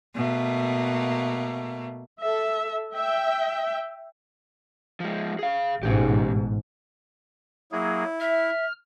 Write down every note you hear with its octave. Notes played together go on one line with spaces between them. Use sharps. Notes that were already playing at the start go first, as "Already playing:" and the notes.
B2 A3 A#3
A4 E5
E5 G5
F3 G#3
G#4 F5
A1 G#2 B2 C#4 G4
F#3 A#3 E4 G#4
E5 F6